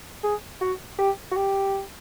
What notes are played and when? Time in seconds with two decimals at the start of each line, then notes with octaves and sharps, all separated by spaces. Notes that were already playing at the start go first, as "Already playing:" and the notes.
0.24 G#4
0.61 F#4
0.98 G4
1.31 F#4
1.36 G4